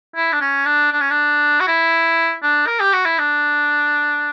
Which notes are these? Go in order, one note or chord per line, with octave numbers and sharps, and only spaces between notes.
E4
D4
C#4
D4
D4
C#4
D4
F#4
E4
D4
A#4
G4
F#4
E4
D4